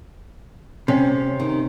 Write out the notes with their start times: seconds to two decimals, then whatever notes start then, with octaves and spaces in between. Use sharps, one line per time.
0.88 C3 C#4
1.40 D#3